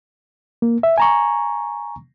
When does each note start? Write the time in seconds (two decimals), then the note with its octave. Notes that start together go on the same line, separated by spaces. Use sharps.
0.62 A#3
0.83 E5
0.98 G#5 A#5 C#6